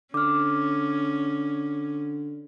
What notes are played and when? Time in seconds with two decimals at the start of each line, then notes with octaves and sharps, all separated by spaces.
0.14 D3 C#4 D6 F6